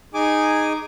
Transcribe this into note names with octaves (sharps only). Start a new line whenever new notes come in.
D#4 G#4 G#5 D6